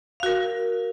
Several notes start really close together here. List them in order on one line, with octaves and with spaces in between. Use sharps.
F5 F#4 A#4